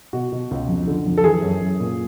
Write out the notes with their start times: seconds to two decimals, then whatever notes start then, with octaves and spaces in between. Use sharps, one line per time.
0.13 B2 F#4
0.32 B2
0.51 C#2
0.68 F2
0.87 D3
1.06 F2
1.18 A4
1.24 E3 G#4
1.42 F#2
1.61 F#2
1.80 A#2